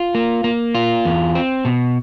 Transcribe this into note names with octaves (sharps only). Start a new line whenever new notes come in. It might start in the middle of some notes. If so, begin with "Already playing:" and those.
Already playing: F4
A#3
A#3
F4
E2
C4
B2